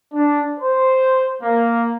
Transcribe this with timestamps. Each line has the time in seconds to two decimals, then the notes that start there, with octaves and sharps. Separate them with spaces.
0.13 D4
0.59 C5
1.43 A#3